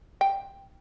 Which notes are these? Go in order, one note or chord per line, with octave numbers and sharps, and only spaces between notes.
G5